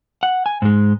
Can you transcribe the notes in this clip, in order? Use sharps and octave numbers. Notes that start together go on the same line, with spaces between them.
F#5
G#5
G#2 G#3